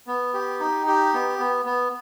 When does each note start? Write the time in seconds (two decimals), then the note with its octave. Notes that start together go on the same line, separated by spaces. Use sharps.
0.07 B3
0.34 G4
0.60 D#4
0.87 G4
1.14 B3
1.39 B3
1.66 B3